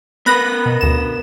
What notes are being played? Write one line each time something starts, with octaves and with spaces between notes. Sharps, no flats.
B3 A#4 B4 B5 F#6 A#6
B2
D2 E7